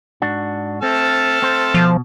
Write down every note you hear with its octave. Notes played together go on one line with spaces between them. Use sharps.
G#2 D4 F#4
A3 C4 A4 A5 F6
C4 C5
B2 F3